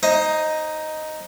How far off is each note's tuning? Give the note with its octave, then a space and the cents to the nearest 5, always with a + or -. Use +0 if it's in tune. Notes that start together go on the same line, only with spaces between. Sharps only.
D#4 +0 C5 +30 D#5 +5